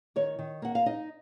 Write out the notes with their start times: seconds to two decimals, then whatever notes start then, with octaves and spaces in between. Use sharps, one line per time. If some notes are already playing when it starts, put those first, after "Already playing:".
0.16 D#3 C#5
0.39 D#3
0.62 A#3 F#5
0.75 F5
0.86 D#4 D#5